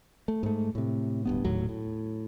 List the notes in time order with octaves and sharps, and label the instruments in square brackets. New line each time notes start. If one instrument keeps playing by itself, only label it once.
[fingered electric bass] A3
G#2 A3
A2 C3
D1 G2 B3
D#1 D#2 A2 F#3
A2